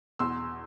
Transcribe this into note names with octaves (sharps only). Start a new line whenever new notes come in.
E2 B2 C6 E6